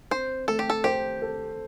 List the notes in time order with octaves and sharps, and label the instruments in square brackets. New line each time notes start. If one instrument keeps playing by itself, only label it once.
[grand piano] C4 [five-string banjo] C5
[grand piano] A3 [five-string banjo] A4
[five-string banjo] G4
A4
[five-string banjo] G4 [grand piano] C5
[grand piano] A4